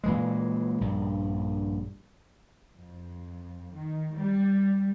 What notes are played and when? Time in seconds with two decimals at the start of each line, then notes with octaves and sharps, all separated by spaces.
0.04 A#2 E3 G#3
0.81 A#1 G2
2.74 F2
3.74 D#3
4.16 G3